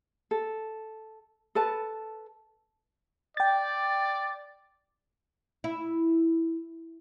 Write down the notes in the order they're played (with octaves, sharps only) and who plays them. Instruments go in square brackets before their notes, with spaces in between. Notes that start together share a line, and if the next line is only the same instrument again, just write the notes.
[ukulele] A4
A4 B4 A5
[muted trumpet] D5 [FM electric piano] G5 A6
[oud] E4